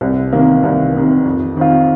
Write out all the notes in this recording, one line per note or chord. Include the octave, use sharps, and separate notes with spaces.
C2
C3 D#3 A#3
C2
C3 D#3 A#3
F2
D#3 C4 F4